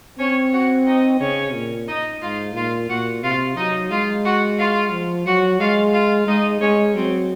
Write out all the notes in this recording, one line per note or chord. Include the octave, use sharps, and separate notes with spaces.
C4 C#4 C#5
F#4 F#5
D#4 D#5
C#3 C#4 C#5
A#2
D#4 D#5
G#2 F4 F5
A#2 F4 F5
A#2 F#4 F#5
C3 F4 F5
F#3 D#4 D#5
G#3 F4 F5
F#4 F#5
F4 F5
F3
F#3 F#4 F#5
G#3 F4 F5
F4 F5
G#3 D#4 D#5
G#3 C#4 C#5
F#3 C4 C5